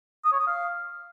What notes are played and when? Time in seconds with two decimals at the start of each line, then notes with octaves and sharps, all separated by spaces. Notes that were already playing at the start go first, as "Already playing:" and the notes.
0.25 D#6
0.32 C#5
0.40 D#6
0.47 F5